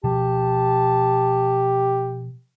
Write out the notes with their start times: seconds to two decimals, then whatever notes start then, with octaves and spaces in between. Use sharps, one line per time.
0.04 B2 F3 G4 A5